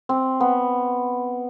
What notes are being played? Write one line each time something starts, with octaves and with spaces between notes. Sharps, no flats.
C4
B3